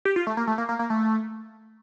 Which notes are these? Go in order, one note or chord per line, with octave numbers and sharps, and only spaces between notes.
G4
F4
A3
A#3
A3
A#3
A#3
A#3
A3